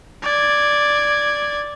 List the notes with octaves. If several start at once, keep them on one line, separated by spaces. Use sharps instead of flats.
D5 G#6